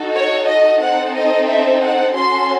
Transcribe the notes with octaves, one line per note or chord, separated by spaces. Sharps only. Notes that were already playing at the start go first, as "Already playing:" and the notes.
Already playing: D#4 F#4 A4
C#5
D#5
C4 D#4 A4 F#5
D#5
E5
F#5
C#4 F#4 A4 C6